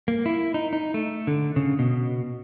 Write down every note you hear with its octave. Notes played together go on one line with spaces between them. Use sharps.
A#3
E4
D#4
D#4
A3
D3
C#3
B2